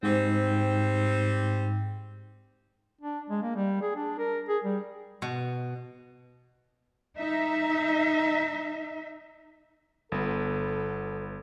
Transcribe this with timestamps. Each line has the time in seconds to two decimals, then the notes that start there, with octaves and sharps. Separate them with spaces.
0.03 G#2 G3 C4
3.01 D4
3.30 G#3
3.42 A#3
3.56 G3
3.82 G#4
3.96 D4
4.18 A#4
4.48 G#4
4.64 G3
5.22 B2
7.16 D#4 E5
10.12 G1 B3 A4